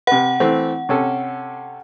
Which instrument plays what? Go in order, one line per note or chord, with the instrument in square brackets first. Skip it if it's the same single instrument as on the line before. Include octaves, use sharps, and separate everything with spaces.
[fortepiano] C3 B4 [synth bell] F#5
[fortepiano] E3 A3 C4
C3 C#4 A4